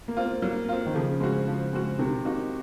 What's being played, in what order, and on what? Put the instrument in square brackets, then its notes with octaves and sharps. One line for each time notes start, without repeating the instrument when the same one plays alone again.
[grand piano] A#3
[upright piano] C4 F4
[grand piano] A#3
[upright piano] F#3 [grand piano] A#3
[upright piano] C4 F4
[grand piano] D#3
[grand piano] C#3 [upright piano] F3
[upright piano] G#3 C4 F#4
F3
G#3 C4 F#4
[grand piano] C3 [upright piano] D#3
[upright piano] A#3 D#4 F#4